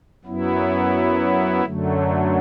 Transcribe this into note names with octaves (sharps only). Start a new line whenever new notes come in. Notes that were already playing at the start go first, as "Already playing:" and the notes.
F#2 F#3 B3 E4
F#2 D3 F#3 A3